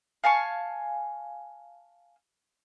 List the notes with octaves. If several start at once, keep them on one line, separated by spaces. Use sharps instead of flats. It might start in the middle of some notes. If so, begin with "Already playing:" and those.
F5 G#5 A5 C#6